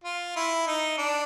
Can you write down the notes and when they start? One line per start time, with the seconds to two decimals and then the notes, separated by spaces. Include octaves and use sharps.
0.04 F4
0.36 E4
0.67 D#4
0.98 D4